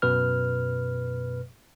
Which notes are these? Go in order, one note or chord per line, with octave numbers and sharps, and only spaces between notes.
F#2 B2 B4 F6